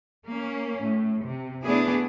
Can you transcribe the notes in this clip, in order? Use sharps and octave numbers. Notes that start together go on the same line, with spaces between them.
A#3 C#4
A2
C3
A3 B3 D4 E4 G#4